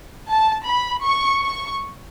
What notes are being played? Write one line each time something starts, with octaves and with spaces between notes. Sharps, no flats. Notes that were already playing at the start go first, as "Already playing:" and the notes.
A5
B5
C#6
C#6